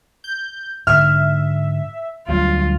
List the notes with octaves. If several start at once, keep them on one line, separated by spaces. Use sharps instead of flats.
G6
G#2 D3 E5 F6
D2 F#3 G3 F4